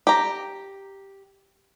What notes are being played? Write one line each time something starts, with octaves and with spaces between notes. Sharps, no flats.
G4 A#5